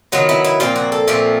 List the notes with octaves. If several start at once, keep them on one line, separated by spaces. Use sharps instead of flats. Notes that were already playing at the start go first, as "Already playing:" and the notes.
D#3 F#3 B3 F4
E4
E4
A#2 F3 A3 C4 F4
F#4
A4
A#2 F3 A3 C4